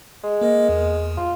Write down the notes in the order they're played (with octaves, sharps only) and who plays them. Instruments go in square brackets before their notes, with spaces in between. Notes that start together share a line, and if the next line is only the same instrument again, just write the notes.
[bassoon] G#3
[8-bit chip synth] A#3 A#4 D#5
E2
[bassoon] F4